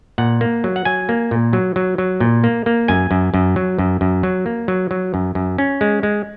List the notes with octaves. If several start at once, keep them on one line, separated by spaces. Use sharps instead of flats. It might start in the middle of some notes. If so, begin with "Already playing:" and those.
A#2 F#5
A#3
F#3
F#5
F#3 G#5
A#3
A#2
F#3
F#3
F#3
A#2
A#3
A#3
F#2 G#5
F#2
F#2
F#3
F#2
F#2
F#3
A#3
F#3
F#3
F#2
F#2
C#4
G#3
G#3